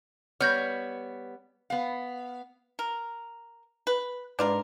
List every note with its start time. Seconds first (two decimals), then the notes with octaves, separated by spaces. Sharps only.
0.40 G3 B3 C#5 F6 G6 A#6
1.70 B3 F5
2.79 A#4
3.87 B4
4.39 G#2 D4 F4 A#4 B4 D5